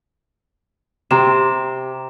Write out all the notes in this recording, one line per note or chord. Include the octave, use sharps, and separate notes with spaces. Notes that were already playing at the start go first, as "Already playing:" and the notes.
C3 G4 A#5 E7